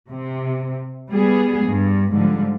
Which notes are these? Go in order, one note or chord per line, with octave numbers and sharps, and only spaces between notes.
C3
G3 B3 G#4
G2
G#2 D3 F3 G3